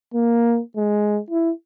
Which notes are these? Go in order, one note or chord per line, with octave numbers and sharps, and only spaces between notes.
A#3
G#3
E4